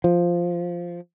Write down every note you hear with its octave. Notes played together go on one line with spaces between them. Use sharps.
F3